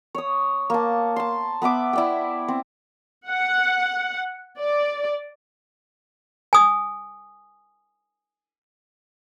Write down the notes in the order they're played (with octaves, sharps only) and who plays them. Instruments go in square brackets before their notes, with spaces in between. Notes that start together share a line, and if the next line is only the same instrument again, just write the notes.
[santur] C#5 D#6
A#3 A5
A5 C6
B3 B4 E5 D6
E4 D5 G5
C4
[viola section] F#5
D5
[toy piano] G#5 D#6